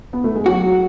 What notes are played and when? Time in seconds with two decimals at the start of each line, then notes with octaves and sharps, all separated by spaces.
0.13 B3
0.24 A3
0.35 G#3
0.46 F#3 F#4